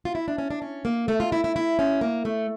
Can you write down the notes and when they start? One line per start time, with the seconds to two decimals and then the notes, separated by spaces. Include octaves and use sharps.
0.05 F4
0.15 E4
0.28 D4
0.38 C#4
0.51 D4
0.62 C#4
0.85 A#3
1.08 A3
1.20 F4
1.32 E4
1.44 E4
1.56 E4
1.79 C#4
2.01 A#3
2.25 A3